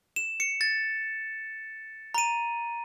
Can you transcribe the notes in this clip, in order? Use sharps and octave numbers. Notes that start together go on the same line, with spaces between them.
E7
C#7
A6
A#5 D#7